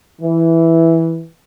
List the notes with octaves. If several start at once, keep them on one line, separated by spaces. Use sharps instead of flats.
E3